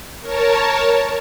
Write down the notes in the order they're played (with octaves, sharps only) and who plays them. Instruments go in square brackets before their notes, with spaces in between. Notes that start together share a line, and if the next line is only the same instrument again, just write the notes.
[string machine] A#4 C#5 A5